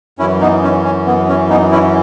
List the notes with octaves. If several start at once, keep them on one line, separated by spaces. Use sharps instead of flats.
F#2 E3 C#4 E4
B3 D#4
C#4
C#4
B3
C#4
B3 D#4
C#4 E4